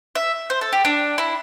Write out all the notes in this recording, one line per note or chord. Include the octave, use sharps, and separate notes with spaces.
E5
C5
A4
G4
D4
E4